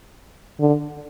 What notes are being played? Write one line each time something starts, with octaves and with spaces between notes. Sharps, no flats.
D3